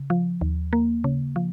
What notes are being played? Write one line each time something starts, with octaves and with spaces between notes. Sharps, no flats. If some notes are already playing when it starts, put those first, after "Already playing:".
Already playing: C#3
F3
D#2
A#3
C#3
F3